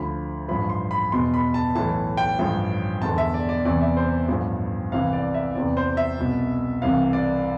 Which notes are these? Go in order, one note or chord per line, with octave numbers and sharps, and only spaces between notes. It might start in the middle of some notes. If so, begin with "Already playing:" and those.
Already playing: D2 D3 F3 B5
A1 G2 F3 B5
C6
B5
E2 B2 C6
B5
A5
B1 A2 E3 A5
G5
A1 G2 F3
E1 E2 D3 A5
E5
D5
D5
E2 C3 E3 D5
E5
C5
A1 G2 F3
C2 C3 E3 F5
D5
E5
E2 C3 E3 D5
C5
E5
C2 B2
C2 C3 E3 F5
D5